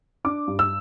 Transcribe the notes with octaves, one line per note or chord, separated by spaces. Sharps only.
D4 D6
G2
E6